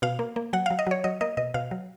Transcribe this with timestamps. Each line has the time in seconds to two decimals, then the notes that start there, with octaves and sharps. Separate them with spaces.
0.02 B2 F5
0.19 A#3
0.36 A#3
0.53 F#3 F#5
0.66 F#3 F5
0.79 D#5
0.87 F#3 C#5
1.04 F#3 D#5
1.21 A#3 D#5
1.37 B2 D#5
1.54 B2 F5
1.71 F#3